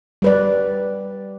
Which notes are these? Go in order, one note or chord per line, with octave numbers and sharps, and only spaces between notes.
G3 B4 D5